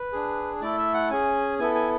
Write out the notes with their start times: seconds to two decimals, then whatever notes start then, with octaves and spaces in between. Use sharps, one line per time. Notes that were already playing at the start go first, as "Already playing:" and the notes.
Already playing: B4
0.13 D4 G#4
0.61 A3 E4 A4 D5
0.78 E5
0.94 F#5
1.10 C#4 G#4 G#5
1.59 B3 E4 A4 G#5
1.75 G#5